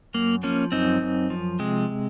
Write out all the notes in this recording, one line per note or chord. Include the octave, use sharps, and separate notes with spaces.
F#2 A#3
F3 A#3 C#4
F#2 C4 D#4
F#2
F3
C3 G#3